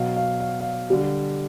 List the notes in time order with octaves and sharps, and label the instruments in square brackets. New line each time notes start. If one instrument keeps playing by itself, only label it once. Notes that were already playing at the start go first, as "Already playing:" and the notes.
Already playing: [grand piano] B2 F#3 F5
F5
F5
F5
D3 G3